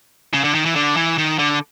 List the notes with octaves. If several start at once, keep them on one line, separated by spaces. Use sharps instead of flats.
C#3
D3
D#3
E3
D3
E3
D#3
D3